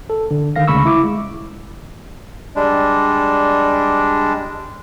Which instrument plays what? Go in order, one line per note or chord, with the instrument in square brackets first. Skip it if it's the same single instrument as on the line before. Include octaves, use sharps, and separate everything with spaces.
[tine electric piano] A4
D3
D3 D#3 F5 A#6
D2 C#3 G#3 B5 C#6 E6
E4 D6
G#3
[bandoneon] G3 G#3 D4